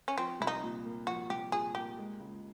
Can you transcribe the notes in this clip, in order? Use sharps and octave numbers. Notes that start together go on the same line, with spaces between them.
C#4
F3 C4
C2 E4
D#4
A#2
A#3
F3 F#4
C2 G4
A#2 G#4
A#3 G4
G#3
C#2